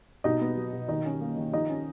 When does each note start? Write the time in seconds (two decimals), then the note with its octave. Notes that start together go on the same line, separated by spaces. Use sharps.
0.24 B2 D#4 D#5
0.41 B3
0.57 F#3
0.73 B2
0.88 D#3 D#4 D#5
1.05 C#4
1.21 A#3
1.37 D#3
1.53 F3 D#4 D#5
1.69 C#4